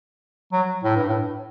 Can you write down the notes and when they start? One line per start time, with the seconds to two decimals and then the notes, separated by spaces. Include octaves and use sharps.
0.52 F#3
0.83 A2
0.96 G2
1.08 A2